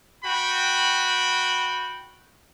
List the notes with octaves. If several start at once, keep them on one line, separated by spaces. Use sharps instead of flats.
F#4 G5 B5